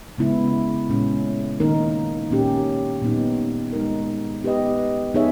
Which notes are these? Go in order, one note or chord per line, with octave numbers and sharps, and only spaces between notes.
C#3 G#3 B3 E4
A#2 G#3 C#4
D#3 A#3 D#4 A#4
A#2 A#3 C#4 G4
A#2 G3 B3 D#4
G#3 D#4 A#4
B3 G4 B4 D#5
B3 D#4 G#4 C#5 E5